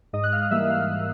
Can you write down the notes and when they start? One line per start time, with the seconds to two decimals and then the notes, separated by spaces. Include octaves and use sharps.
0.13 G#2 D#5 D#6
0.24 F#6
0.32 F5 F6
0.51 E3 G3 A#3 E5 E6
0.70 F5 F6